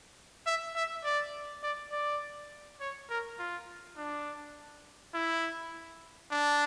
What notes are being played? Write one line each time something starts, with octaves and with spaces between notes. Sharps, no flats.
E5
E5
D5
D5
D5
C#5
A#4
F4
D4
E4
D4